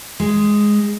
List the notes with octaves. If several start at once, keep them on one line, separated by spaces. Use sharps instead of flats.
G#3